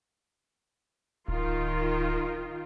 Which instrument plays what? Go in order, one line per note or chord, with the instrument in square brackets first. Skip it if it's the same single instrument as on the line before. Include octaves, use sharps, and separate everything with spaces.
[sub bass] D1 [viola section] D#3 F4